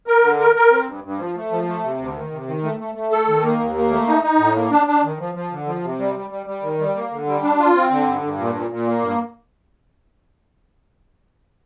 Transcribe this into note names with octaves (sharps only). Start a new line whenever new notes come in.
A#4
D3
A#4
A#4
C4
G2
G2
F3
A3
F3
A3
C3
D2
D#3
C3
D#3
A3
A3
A3
A4
D#3
A#3
D#2
A#3
A3
D#4
D#4
A2
A#3
D4
D4
D#3
F3
F3
D3
F3
C3
G3
G3
G3
G3
D#3
G3
A#3
D3
G3
D4
F4
C4
D3
G2
G2
A#2
A#2
A#2
A#3
G2